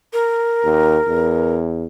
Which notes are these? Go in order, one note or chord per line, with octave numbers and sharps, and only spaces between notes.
A#4
D#2
E2